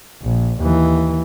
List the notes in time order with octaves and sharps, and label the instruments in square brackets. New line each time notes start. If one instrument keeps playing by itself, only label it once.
[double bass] A#1
D#2 E3